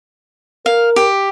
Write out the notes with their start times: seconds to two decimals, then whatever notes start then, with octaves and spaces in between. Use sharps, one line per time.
0.66 A#4 F5
0.96 G4